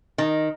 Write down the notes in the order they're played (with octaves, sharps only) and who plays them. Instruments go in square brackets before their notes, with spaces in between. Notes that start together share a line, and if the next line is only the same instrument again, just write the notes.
[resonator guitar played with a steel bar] D#3